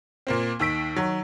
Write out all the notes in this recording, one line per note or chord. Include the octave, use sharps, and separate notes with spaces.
A#2 A#3 C4
D#2 D#3 E6 B6 D7
D#3 F#3